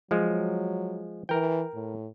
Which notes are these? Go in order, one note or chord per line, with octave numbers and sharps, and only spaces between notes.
F3 F#3 G#3
E3 A#4 G5
A2